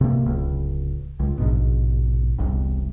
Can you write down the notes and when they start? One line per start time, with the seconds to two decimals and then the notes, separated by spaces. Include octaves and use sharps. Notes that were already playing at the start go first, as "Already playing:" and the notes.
0.01 C3 A#3
0.26 D1 C#2
1.20 C#2
1.38 A#1 G#2 B2
2.38 E1 C2 C3